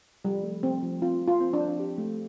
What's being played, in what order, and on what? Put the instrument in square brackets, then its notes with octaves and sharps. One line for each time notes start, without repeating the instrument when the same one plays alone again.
[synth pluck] F3 [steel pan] G3
[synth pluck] A3
[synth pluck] A3 [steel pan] C4
[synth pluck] F3
[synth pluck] C4 [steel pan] F4
[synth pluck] F3
[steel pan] F4
[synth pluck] C4
[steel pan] D4
[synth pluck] C4
G4
A3